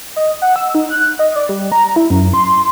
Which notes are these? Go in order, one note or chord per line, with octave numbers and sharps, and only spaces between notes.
D#5
F#5
E6
D#4
F#6
D#5
D5
G3
A#5
E4
F#2
C6